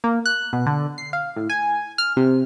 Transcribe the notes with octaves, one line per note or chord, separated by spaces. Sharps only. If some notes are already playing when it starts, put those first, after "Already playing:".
A#3
F#6
B2
D3
C7
F5
A2
G#5
F6
C3